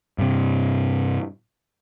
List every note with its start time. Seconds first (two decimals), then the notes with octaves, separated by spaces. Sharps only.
0.18 G2 C3